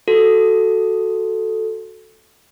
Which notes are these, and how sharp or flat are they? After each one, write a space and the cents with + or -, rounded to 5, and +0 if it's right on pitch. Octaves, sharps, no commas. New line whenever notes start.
F#4 +0 A4 +0